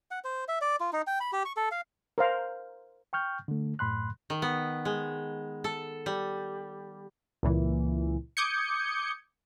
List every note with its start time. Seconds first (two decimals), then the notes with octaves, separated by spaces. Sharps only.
0.11 F#5
0.24 C5
0.48 E5
0.61 D5
0.80 F4
0.93 D#4
1.07 G5
1.20 B5
1.33 G4
1.45 C#6
1.57 A4
1.71 F5
2.18 A#4 C5 F5
3.13 G5 C#6 F6 G6
3.48 D3 A3
3.79 F#2 A2 B5 C6 F#6
4.30 D#3
4.42 B3
4.85 G#3
5.64 A4
6.06 G3
7.43 C#2 A#2 E3
8.37 D6 D#6 G6 G#6 C#7